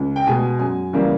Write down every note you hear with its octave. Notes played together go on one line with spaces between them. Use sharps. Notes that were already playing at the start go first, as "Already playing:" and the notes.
Already playing: C#2
G5
B2 G#3 G#5
F#2 G#5
C#3 E3 G3 A#3